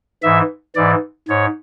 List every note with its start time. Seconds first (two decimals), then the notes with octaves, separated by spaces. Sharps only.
0.23 G#2 E3 E5
0.75 G#2 E3 D5
1.28 G#2 C#5